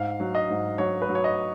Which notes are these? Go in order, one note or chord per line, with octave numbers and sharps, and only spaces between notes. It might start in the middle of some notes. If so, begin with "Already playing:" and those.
Already playing: G#2 F5
F#3
D#5
G#2
F#3 C#5
B4
F#3
C#5
D#5